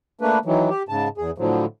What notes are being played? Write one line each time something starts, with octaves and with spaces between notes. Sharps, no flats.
A3 A#3 D4 B4
D#3 E3 F#3
G4
G#2 C#3 A5
E2 G#4
A2 D3 F3 F#3